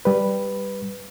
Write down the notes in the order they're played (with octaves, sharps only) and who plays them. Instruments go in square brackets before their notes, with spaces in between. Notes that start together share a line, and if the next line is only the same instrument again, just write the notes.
[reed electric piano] G3 B4